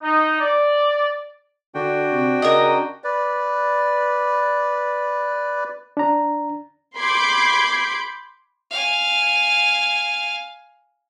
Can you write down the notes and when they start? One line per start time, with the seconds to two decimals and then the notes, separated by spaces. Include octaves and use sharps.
0.02 D#4
0.40 D5
1.75 D3 D4 F#4 G5
2.12 C3
2.42 C#3 A#4 D#5
3.04 B4 D5
5.97 D4 A#5
6.98 B5 C6 D6 G6 G#6
8.71 F5 G#5